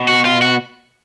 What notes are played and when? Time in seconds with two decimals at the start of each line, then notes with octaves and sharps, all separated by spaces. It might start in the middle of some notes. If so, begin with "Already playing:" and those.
Already playing: B2
0.08 F#4
0.25 F4
0.42 F#4